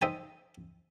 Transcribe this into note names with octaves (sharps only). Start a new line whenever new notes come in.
D#4 C5 E5 G5 G#5 A#5